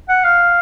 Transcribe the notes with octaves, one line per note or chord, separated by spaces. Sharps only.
F#5
F5